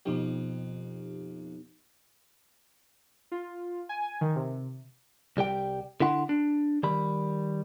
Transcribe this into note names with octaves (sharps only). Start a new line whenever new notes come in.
F2 B2 D#4 G4
F4
G#5
D#3
C3
C2 G3 G4 G5
D3 E4 F#5 C6
D4
D#3 G3 B5